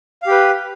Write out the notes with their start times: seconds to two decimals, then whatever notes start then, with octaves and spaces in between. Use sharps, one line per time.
0.23 F5
0.27 G4
0.31 B4